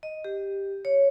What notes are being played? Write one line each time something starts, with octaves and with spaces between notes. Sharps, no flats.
D#5
G4
C#5